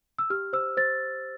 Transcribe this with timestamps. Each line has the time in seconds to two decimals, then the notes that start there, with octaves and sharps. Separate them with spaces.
0.19 E6
0.30 G4 F6
0.53 C5 E6
0.77 C5 A6